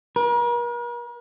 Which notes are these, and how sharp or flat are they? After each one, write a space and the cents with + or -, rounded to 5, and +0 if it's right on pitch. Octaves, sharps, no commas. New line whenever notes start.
A#4 +45